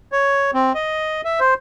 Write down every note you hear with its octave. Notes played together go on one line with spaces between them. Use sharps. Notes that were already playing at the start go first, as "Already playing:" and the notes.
C#5
C4
D#5
E5
C5